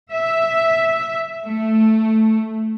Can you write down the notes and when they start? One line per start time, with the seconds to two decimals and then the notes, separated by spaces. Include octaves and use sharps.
0.11 E5
1.46 A3